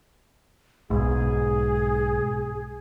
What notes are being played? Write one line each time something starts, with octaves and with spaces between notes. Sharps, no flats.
B1 G#2 G#4